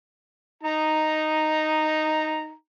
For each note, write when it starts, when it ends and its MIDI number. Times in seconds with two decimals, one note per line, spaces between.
0.63 2.52 63
0.63 2.52 82